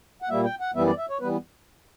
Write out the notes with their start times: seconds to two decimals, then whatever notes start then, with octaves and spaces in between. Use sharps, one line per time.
0.22 F#5
0.29 A#2 G3 A#3 E5
0.44 G5
0.60 F#5
0.75 F#2 E3 G3 B3 E5
0.87 D5
0.98 E5
1.10 C#5
1.20 E3 G3 B3 B4